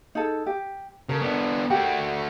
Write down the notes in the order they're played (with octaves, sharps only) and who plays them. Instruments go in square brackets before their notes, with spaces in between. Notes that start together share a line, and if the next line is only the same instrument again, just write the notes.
[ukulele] D#4 G#4 A4
G4
[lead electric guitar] C#3 [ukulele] A4 A#4
[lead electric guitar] B3 D4
[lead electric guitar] A3 F#4 [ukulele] G4 A#4 G5